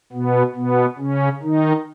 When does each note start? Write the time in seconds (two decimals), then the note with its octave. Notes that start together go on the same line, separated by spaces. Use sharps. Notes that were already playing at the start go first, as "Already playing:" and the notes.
0.12 B2 B3
0.55 B2 B3
0.99 C#3 C#4
1.42 D#3 D#4